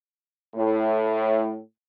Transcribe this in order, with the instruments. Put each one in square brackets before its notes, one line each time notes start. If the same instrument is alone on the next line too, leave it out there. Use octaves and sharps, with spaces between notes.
[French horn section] A2